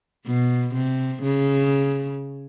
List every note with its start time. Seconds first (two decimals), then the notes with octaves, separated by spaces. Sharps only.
0.26 B2
0.75 C3
1.23 C#3